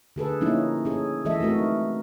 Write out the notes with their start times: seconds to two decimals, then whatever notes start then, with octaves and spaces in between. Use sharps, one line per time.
0.16 D3 G#4 A4 B4
0.41 F3 A#3 C#4 D#4 E4
0.85 C#4 G#4 A4
1.25 E3 G#3 A4 D#5 E5
1.41 A3 C4 F#4 A#4
1.59 D#4